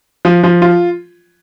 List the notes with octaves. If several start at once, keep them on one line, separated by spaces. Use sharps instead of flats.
F3
F3
F4